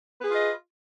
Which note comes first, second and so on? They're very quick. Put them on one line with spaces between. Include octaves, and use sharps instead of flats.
B4 G#4 F4 D#5